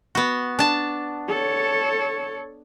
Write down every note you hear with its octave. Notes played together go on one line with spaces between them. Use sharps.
B3 F#4
D4 A5
A4 C#5